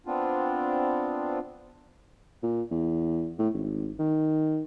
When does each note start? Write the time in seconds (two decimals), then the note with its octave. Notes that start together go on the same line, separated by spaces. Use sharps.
0.06 B3 C4 D4 F4
2.43 A#2
2.71 E2
3.39 A2
3.54 G#1
3.99 D#3